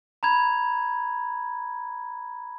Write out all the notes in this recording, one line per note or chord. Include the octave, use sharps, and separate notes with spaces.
A#5 B5 G#6